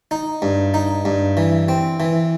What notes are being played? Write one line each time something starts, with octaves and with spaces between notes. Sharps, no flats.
D#4
G2
D#4
G2
E3
C4
E3